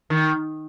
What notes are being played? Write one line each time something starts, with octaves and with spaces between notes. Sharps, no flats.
D#3